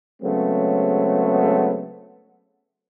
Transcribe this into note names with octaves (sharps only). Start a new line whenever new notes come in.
C#3 F#3 G#3 A3 B3 C4